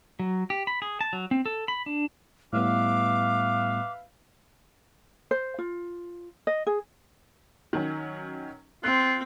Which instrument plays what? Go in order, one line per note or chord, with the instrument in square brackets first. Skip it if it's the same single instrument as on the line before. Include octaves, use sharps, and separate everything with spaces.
[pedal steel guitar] F#3
G4
B5
G#4
A5
F#3
C4
A4
B5
D4
[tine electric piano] A2 G3 B3 [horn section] B4 E5 F5 [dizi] D6
[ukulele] C5
F4
D#5
G#4
[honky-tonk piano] D#3 F#3 C#4
[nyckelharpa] C4 [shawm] F4 [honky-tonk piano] F#6